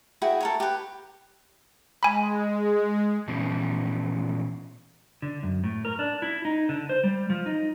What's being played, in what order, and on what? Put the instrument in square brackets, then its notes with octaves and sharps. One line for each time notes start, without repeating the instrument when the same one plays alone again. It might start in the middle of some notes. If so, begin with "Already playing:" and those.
[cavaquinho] E4 F#4 G#4 G5
A4 A#4 C#5
G4 B4
[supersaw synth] G#3 [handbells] G#5 B5
[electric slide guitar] A#2 E3 F3 B3 C#4
D3
F#2
A2
A#4
D4
E4
D#4
D3
C5
G3
F3
D#4